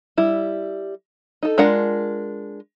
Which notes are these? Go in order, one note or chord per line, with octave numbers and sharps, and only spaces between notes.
G3 E4
D#4 A4
G#3 D4 F4 A#4 F#5